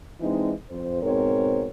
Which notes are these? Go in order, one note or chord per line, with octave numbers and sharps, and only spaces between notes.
E3 G#3 C4 D4 D#4
F2 C5
G#2 B2 C4 A#4 C#5